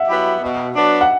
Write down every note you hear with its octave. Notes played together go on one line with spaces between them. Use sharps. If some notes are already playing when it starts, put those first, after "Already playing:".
Already playing: E5 F#5
F#3 B3 E4 G4
B2
F#3 B3 D4
F#5